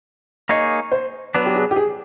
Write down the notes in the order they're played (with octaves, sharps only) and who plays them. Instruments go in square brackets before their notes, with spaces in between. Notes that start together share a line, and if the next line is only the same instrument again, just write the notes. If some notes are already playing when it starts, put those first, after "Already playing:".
[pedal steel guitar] A#3 D#4 G#4 C#5 [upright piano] D#5
[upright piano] C5
[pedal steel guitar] F#3 B3 D4 [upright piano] B4
[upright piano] G4
G#4
G4
G#4